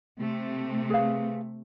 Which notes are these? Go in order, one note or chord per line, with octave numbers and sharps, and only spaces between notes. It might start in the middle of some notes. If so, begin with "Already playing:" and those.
C3 A3
G#4 B4 F5